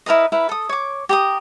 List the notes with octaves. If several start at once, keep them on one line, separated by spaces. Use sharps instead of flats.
E4 A#4 B4 D#5
E4 A#4 B4
A4 D#6
C#5 D6
G4 A#5 D#6